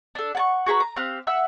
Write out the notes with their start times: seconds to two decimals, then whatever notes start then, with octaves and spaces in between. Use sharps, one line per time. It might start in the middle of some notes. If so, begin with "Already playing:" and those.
0.15 D4 A4
0.35 F#5 A5 C#6
0.66 F#4 G#4 B4 A#5
0.80 A#5
0.96 C4 G4 F5 F#6
1.27 E5 F#5 E6